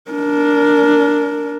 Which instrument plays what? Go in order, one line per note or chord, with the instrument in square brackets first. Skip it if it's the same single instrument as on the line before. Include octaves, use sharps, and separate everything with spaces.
[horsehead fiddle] D4 A#4